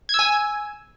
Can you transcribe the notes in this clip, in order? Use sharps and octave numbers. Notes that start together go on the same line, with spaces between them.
G#5 E6 G#6